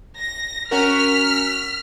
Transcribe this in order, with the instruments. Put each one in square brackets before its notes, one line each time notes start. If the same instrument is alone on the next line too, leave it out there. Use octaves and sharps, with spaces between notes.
[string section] A#6
[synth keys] C#4 F#4 A#4 [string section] F6 B6